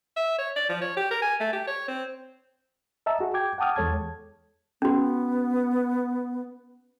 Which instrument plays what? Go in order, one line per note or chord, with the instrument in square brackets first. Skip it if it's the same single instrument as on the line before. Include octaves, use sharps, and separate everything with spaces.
[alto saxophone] E5
C#5
D5
F3
C#5
G4
A#4
G#5
A3
G4
C#5
C4
[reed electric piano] D#5 E5 A5 A#5 E6
F#4 G#4
G5 D6 G6 G#6
F#5 G5 A5 D6 D#6 F6
E2 G#3 A4 C#5 A5 G#6
[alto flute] B3 [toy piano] C#4 F#4